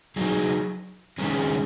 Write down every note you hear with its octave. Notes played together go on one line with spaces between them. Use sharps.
F#3 D#4 G#4
D#3 G#3 C#4 G#4